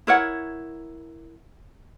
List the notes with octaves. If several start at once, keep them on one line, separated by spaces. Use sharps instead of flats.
E4 A#4 C#5 F#5